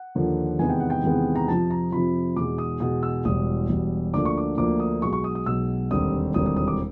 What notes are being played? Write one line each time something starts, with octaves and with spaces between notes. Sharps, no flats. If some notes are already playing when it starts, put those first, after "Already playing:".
Already playing: F#5
D#2 D3 F3 A#3
E2 C3 D#3 G#3 B3 G#5
G5
F#5
G5
E2 C3 D#3 G#3 B3
A#5
F2 C3 F3 A5
A#5
F2 C3 F3 B5
E2 B2 G#3 D6
D#6
E2 B2 G#3 D#6
E6
E1 E2 B2 G3 D#6
E1 E2 B2 G3
D2 D3 F3 A#3 D4 D6
C#6
D6
D2 D3 F3 A#3 D4 D6
D#6
B1 B2 G#3 C#6
C#6
D#6
D#6
B1 B2 G#3 E6
E1 D#2 D3 G3 C4 D#6
E1 D#2 D3 G3 C4 D#6
D#6
D#6
D6